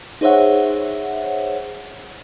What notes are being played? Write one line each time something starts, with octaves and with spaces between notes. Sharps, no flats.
D#4 G#4 C5 C#5 E5 F#5